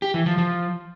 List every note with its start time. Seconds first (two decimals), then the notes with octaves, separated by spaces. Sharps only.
0.02 G4
0.14 E3
0.26 F3
0.38 F3